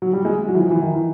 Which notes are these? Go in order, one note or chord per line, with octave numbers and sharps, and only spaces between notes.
F#3
G3
G#3
F#3
E3
F3
E3
D#3
E3